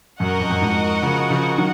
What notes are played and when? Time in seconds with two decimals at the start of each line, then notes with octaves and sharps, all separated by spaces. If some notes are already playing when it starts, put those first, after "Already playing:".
0.20 F#2 F#4 A#4 D#5 F#5
0.40 F2
0.50 F#2
0.61 F2 G#2
1.03 C#3 F3
1.30 C#3 F3
1.58 D#3 F#3